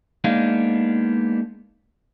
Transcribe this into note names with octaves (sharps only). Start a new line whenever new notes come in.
G#3 A#3 B3 D4 D#4 F5